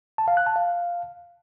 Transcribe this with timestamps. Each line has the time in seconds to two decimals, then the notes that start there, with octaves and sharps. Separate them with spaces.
0.18 A5
0.28 F5
0.37 F#6
0.46 A5
0.56 F5